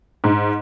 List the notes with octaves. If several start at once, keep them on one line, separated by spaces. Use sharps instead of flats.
G#2